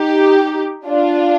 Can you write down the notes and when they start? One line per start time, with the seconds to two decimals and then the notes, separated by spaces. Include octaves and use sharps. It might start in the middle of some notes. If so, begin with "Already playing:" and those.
Already playing: D#4 G4
0.87 D4 F4